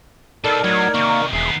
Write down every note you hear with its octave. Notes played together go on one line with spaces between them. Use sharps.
B2 G3 D#4 A4 A#4 D5 A5
A2 F#3 G#6
C3 D#3 A#3 C#6
E1 D#3 B3 G#4 E5 C7